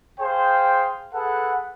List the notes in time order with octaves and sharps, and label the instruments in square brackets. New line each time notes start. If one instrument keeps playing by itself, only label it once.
[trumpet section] G#4 C5 F5 G5
G#4 A4 B4 F#5